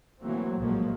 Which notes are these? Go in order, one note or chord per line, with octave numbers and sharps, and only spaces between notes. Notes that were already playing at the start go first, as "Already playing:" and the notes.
E3 F#3 A3 A#3 C4
A#1 A2 F3 F#3 G#3 A#3